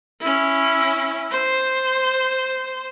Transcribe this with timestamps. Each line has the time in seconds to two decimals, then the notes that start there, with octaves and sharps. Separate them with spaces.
0.21 C#4 E4
1.31 C5